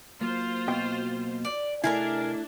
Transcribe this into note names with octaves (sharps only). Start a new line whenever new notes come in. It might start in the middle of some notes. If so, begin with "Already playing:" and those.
F#3 A#3 F4 C5
B2 G5
D5
C3 A3 D4 E4 G#4 A#4 D#5 A#5